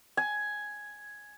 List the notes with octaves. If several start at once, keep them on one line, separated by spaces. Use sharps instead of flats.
G#5